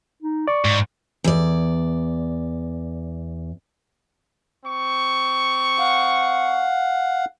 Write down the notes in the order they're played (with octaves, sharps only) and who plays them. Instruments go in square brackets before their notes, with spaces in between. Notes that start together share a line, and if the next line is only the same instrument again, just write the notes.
[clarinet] D#4
[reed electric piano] D5 [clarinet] C#6
[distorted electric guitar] G#2
[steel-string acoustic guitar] E2 D5
[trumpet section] C4 C#6
[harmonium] F5 F#5